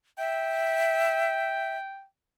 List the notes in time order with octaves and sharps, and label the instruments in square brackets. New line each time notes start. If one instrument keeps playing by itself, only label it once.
[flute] E5 [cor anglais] G5